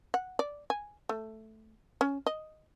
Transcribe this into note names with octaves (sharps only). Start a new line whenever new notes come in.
F#5
D5
G#5
A3
C#4
D#5